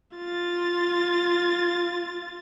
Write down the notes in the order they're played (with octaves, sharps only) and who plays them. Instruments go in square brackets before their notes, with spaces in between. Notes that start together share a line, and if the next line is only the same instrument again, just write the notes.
[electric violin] F4 A6